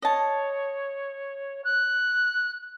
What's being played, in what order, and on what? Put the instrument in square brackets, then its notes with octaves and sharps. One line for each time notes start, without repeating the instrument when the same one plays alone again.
[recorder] C#5 [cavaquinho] D#5 A5
[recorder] F#6